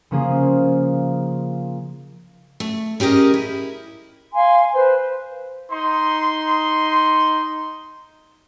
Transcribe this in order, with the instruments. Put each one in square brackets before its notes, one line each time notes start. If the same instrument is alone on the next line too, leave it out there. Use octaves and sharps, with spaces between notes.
[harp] C#3 F3 A#3 F4 G#4
[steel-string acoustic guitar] A3
C#4 G4 G#4 A#4 D#5
E4
[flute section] F5 G#5 C6
B4 C5
[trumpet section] D#4 C6